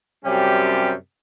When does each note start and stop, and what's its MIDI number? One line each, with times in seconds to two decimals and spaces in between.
0.24 0.92 42
0.24 0.92 48
0.24 0.92 55
0.24 0.92 61
0.24 0.92 67
0.24 0.92 79